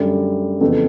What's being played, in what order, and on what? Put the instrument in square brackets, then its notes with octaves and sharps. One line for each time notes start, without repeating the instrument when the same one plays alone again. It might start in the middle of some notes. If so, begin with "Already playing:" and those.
Already playing: [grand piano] F#2 D3 G3 A3
F2 C#3 E3 A3 B3